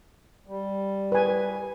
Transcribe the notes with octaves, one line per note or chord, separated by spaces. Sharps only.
G3
B4 G#5